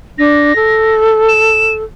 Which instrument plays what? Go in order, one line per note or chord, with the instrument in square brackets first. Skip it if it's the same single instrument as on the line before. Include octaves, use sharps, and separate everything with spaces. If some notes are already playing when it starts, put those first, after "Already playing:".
[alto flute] D4 [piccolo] A#6
[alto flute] A4
[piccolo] E7